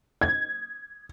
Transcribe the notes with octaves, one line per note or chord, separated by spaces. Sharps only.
G#6